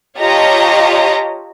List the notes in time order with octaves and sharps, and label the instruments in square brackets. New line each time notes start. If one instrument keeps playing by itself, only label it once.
[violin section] F4 G4 C#5 D#5 A5 A#5